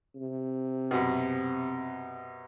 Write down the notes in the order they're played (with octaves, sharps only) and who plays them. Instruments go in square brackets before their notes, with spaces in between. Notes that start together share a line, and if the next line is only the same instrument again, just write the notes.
[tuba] C3
[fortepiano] F#2 B2